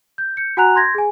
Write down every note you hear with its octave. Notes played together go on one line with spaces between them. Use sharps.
G6
G6 C#7
F#4 F#5 G#5 A#5 F#6 F7
C6 G6 G#6 A#6
G#4 G#5